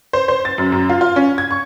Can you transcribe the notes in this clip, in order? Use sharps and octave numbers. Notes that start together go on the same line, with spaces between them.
C5
C5
A6
F#2
F#2
F4
F4
C#4
G#6
C#6